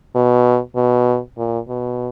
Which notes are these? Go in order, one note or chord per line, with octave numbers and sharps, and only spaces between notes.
B2
B2
A#2
B2